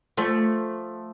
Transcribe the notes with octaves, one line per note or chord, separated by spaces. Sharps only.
F3 A3